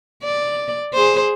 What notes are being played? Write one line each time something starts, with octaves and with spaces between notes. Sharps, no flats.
D5
G#4 C5